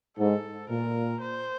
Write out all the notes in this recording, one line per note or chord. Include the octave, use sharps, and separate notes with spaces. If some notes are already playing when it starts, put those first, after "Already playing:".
G#2 A4
A#2 A#4
C5